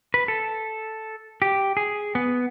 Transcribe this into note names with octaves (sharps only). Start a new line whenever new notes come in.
B4
A4
G4
G#4
B3